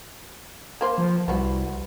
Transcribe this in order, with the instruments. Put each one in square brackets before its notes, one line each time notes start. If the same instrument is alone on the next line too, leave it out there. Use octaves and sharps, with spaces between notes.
[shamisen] A#3 C5
[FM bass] F3
[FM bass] C2 [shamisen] B3 F#4